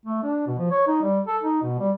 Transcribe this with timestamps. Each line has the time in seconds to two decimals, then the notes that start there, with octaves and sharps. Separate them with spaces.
0.06 A3
0.23 D4
0.47 B2
0.59 F3
0.71 C#5
0.87 D#4
1.02 G3
1.27 A4
1.43 D#4
1.62 B2
1.79 G3